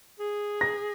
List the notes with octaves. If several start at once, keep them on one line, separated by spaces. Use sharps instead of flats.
G#4
A#6